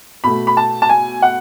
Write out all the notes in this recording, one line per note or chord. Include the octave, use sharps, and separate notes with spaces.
B2 A3 B5
B5
A5
A5
G#5
F#5